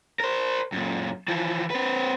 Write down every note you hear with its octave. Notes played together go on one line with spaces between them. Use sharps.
A#4 C5
F#2 A#2
E3 F3
C4 B4